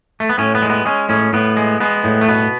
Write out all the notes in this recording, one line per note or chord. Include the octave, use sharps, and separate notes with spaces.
A3
B3
A2 C#4
B3
G#3
B3
G#3 C#4
A2 C#4
A2 B3
G#3
G#3 B3
A2
A3
B2 B3